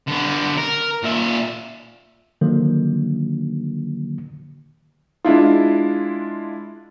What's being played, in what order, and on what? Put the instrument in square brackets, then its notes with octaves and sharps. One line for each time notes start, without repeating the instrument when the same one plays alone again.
[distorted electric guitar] D3 B3
A#4
A#2 E5
[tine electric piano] D3 D#3 F3 F#3 A#3
[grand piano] G#3 D4 E4 F4